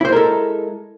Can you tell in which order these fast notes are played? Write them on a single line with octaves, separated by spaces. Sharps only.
E4 C5 G#3 A#4 A4